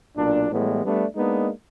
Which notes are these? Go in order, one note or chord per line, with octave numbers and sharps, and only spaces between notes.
B1 A#2 D4
A2 E3 G3 G#3 B3
G3 A3 B3 D4
G#3 A#3 B3 D4 D#4